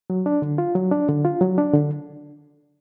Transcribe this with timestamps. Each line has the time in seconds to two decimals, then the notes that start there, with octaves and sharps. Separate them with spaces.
0.10 F#3
0.26 D4
0.42 D3
0.58 F4
0.75 F#3
0.91 D4
1.09 D3
1.25 F4
1.41 F#3
1.58 D4
1.74 D3